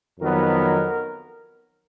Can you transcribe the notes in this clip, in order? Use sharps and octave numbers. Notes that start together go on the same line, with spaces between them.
F2 D#3 F#3 B3 A#4